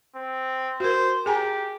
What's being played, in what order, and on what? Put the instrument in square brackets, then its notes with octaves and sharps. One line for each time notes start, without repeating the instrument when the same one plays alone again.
[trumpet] C4
[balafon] F#4 A#4 [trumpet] C5
[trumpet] G4 [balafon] G#4 G#5 A#5